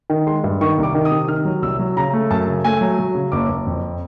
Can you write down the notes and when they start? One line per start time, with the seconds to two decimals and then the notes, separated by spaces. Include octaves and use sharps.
0.10 D#3
0.27 G#3 C6
0.44 G2
0.61 D#3 C#6
0.78 C2 D6
0.94 D#3
1.05 D#6
1.11 C3
1.28 D#3 F6
1.45 F#3
1.62 C2 E6
1.79 F#3
1.97 C#3 A#5
2.13 A3
2.30 F#2 A5
2.47 C#3
2.65 A3 G#5
2.81 F#3
2.99 F#3
3.15 C#3
3.32 F#1 D6
3.49 F#1
3.67 F2